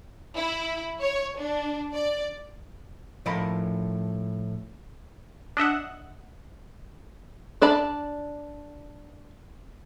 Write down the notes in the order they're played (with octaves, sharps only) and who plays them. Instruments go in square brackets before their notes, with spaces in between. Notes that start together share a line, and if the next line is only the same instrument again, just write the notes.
[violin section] E4
C#5
D4
D5
[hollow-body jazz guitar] A2 F3 A4 A#4 D#5 B5
[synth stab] D4 D#5 E5 F#5
[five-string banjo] D4 D5 A5 B5